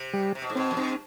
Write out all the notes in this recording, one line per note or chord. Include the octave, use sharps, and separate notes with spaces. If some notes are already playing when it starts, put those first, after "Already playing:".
Already playing: C3
G3
C3
B2
G#2
B2 C4
F2
G2 C4